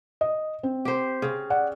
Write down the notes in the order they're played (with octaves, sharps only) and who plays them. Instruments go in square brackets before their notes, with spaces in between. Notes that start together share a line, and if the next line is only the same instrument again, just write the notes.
[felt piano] D#5
C4
[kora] G4 C5
C#3
[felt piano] D5 F#5